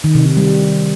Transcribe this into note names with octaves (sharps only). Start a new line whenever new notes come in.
D#3
C3
D#3
G3